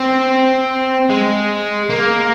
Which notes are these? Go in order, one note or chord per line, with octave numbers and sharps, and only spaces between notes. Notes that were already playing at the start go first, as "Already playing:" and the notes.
Already playing: C4
G#3
A#3